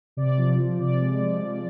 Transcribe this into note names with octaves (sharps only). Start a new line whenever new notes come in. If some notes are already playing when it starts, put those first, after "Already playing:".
C3 D5
F3
F3
C3 D5
G#3
F3
C3